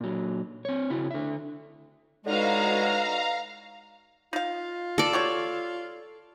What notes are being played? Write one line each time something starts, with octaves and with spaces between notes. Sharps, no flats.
A#2 F#3
C4 C#5
C#3 E4 F#4
D3 E5
A2 D3 G#3 D#4 F#4 B4 F5 A#5
D#4 F4 F5
A4 D5
F#4 G4 C#5